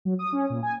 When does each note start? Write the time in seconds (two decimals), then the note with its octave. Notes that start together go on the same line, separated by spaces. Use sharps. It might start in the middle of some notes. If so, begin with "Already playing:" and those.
0.05 F#3
0.19 D#6
0.33 C#4
0.50 A#2
0.63 G#5